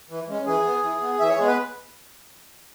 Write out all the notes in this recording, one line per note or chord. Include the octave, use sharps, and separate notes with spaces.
E3
G#3 C#4
E3 G#4
B3
E3
B3
E3 E5
C#5
G#3 B3 G#4
B4